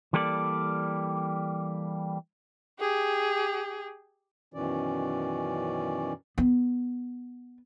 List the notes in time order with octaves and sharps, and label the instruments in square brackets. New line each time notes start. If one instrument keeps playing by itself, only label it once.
[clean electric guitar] E3 G3 A#3 A4 B4 D5
[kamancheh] G4 G#4
[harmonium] F#2 B2 D#3 E3 C#4 D5
[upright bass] B3